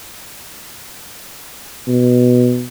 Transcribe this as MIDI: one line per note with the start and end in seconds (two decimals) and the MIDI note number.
1.88 2.67 47